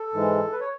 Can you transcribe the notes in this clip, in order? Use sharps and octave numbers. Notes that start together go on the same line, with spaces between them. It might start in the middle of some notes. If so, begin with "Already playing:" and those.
Already playing: A4
G#2 E3 G#3
B4
C#5